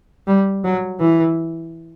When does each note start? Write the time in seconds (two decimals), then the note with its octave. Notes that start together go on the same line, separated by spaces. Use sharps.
0.27 G3
0.64 F#3
1.00 E3